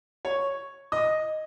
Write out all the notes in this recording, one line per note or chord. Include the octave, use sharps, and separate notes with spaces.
C#5 C#6
D#5 D#6